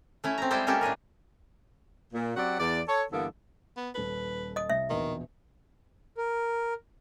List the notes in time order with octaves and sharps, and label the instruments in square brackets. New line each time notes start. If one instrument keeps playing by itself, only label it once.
[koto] A3 C#4 E4
C4 A#5
G3 G#3 E4 G4 A4 C5
G#3 A#3 C#4 G4 A4
A2 D4 G#4 A#4
[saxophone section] A#2
F#3 C4 F#4 G4 D5 F#5
E2 D5
A4 C#5
G2 D3 E3 A#3 B3 A4
[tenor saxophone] B3
[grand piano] D#1 A4 [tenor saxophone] B4
[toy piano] D#5 D#6
[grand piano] C2 [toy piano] E5
[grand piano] A#1 E2 B2 [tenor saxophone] D#3
[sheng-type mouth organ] A#4